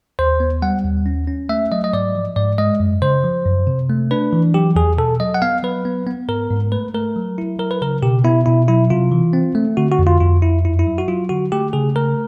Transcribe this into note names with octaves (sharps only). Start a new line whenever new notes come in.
D#2 C5
B3
G3 F#5
D#2
C#4
C#4
A3 E5
F#3 D#5
D#5
G#2 D5
F3
G#2 D5
G#3 D#5
F#2
C#3 C5
F3
F#2
C3
A3
D4 B4
E3
F#3 G4
E2 G#4
B2 A4
F#3 D#5
F#5
B3 F5
F#3 B4
B3
B3
G#2 A#4
G#2
A3 B4
A3 A#4
F#3
E4
F#3 A#4
B4
C#3 A#4
B2 G4
B3 E4
B2 E4
F#3 E4
C3 F4
E3
C4
A3
D3 F#4
F#4
F2
F4
F2 F4
F2 E4
F#2 E4
E4
F#3
F#4
F#3 F4
D3 F#4
A3 G4
C#3 G#4
A3 A#4